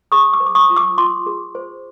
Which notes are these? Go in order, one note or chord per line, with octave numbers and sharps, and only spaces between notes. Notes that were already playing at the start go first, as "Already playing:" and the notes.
G#4 C#6 D#6
D6 E6
C5
D6
C#6 D#6
F4
D6 E6
F4 C6 D6
G#4
C5